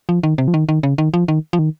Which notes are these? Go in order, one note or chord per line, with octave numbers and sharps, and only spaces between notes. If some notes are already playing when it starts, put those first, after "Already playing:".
F3
D#3
C3
F3
D#3
D#3
C#3
D#3
F3
D#3
F3
D#3